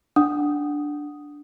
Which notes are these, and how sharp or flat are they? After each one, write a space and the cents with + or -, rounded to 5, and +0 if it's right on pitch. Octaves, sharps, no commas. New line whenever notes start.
D4 +0 F#5 +0 D#6 +0